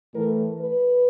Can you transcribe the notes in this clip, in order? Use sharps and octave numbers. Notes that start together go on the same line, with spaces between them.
A2 E3 A#4
B4